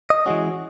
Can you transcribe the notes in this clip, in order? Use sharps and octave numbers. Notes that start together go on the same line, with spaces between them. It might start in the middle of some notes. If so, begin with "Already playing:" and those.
D#5
E3 G#3 C#4 F#4